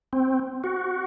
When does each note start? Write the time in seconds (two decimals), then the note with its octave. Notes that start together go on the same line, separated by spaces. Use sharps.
0.13 C4
0.64 F#4